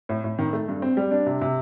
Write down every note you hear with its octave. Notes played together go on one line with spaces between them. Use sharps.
A2
A2
D#3
A3
G2
C4
G3
D4
C3
C3